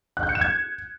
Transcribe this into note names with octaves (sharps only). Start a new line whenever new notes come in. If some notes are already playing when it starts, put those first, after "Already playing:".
F#6
G6
C#7
E7
G#6